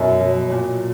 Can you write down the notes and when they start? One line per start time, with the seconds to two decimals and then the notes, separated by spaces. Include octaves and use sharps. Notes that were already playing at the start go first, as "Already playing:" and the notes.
Already playing: F#2 B2
0.20 F#3
0.50 A#2